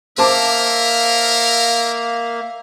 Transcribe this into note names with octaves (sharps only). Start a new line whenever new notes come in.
A#3 A#4 C5 E5 F5 A5 D6